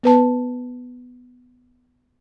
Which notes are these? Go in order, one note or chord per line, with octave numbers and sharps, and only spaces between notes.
B3 B4 A5